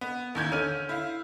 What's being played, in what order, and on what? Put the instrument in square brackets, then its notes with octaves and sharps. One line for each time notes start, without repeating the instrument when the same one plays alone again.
[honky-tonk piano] B3
A1 D#2 G6 G#6
D3 C#4 F6 D#7
E4 F5